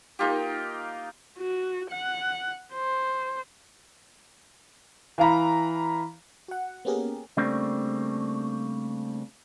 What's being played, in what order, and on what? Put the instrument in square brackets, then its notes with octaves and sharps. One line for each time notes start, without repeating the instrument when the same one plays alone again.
[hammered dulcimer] A#3 D#4 F4 G4
[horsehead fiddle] F#4
F#5
C5
[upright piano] E3 F5 A#5 B5
[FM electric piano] F#4 F#5
A#3 B3 C#4 G4 G#4 A#4
[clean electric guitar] C#3 G3 A3 A#3 C4 D4